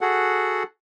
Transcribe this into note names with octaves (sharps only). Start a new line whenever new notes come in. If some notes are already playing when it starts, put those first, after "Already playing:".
F#4 G#4 A4 F#5